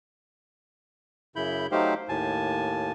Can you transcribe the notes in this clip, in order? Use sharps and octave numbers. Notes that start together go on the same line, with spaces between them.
F#2 C#3 E4 B5 G6
F#3 A3 D#4 G4 C5 F5
D#2 A2 G#5 A5